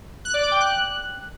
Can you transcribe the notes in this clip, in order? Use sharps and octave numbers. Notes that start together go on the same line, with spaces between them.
F#6
D5
D6
G5
F#6